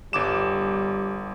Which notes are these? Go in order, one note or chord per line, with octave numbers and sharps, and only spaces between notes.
G1 G3 D6 E7